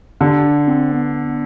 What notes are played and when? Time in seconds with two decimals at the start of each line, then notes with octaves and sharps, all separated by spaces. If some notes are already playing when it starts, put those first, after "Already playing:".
0.21 D3 G4
0.67 C4
0.92 B3